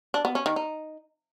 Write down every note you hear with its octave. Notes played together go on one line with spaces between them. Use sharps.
D4
B3
C#4
D#3
D#4